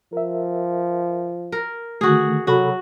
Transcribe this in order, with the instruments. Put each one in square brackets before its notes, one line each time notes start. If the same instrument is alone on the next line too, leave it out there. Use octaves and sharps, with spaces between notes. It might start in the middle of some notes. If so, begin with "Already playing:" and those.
[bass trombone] F3 [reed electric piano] A#4 E5
[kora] A#4
[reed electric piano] D3 D#3 A3 [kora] F#4 G#4
[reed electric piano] C3 A4 B5 [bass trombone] F#3 [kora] F#4